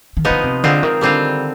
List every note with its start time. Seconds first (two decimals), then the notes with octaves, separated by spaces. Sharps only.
0.17 D#3
0.25 F3 B3 D#4
0.31 D3
0.44 C3
0.64 D3 G#3 C4 F4
0.83 D#3
1.01 D3 G3 C4 F4